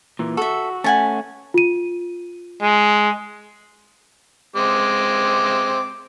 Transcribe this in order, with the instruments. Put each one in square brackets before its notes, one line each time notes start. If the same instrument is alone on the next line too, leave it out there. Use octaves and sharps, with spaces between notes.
[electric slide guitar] A#2 E3
[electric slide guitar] F#4 [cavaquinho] A4 E5
[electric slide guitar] A3 C#4 [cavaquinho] F#5 G#5 A5
[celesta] F4 D#7
[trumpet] G#3
[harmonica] G#3 C4 D6